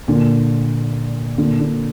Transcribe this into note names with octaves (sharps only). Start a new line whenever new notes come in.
A#2 D3
A#2 D3
A#2 D3